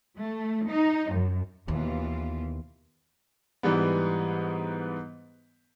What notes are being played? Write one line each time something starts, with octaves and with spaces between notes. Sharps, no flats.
A3
D#4
F#2
D#2 B2 E3 F4
G#2 E3 G3 B3